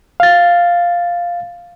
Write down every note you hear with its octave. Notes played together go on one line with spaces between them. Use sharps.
F5 A6